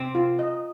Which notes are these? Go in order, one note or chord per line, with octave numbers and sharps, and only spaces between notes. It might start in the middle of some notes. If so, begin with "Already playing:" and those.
Already playing: C3 C4
F4
D#5